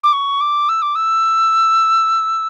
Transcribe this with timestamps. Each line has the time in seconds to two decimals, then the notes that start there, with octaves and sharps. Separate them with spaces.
0.04 D6
0.13 C#6
0.41 D6
0.69 E6
0.82 D6
0.95 E6